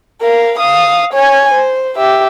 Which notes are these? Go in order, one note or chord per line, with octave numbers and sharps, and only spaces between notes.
A#4 F5
F5 D#6
C#5 G#5
C5
G4 E5